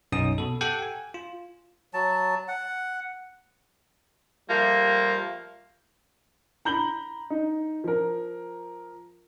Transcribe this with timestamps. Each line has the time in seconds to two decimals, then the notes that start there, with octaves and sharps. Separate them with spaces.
0.12 B1 F#2 C#4 D#4 D#6
0.38 B2 A4
0.61 G4 A4 F#5 G5
0.82 G#5
1.14 F4
1.94 F#3 A5
2.48 F#5
4.48 F3 G3 A3 A#3
6.65 A#5 B5 G6 F#7 G7
7.30 D#4
7.84 F3 A#4